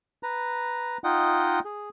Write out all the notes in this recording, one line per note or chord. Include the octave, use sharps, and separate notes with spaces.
B4 A#5
D#4 F4 D#5 F#5 G5
G#4